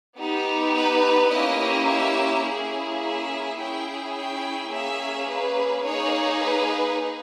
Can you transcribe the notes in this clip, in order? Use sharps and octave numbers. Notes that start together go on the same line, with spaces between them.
B3 D#4 G4
B4
A#3 C#4 E4 G4 D#5
E5
A#3 C#4 E4 G#4
E5
C#4 E4 G#4 G5
G5
A#3 C#4 G#4 E5
B4
A#3 D#4 G#4 C#5
B4